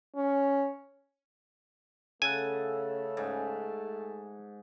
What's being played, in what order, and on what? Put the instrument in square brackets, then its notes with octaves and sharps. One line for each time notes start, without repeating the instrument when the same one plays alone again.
[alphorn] C#4
[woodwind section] C#3 [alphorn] A3 [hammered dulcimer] A4 F#5 [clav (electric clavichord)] G#5
[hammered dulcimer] G#2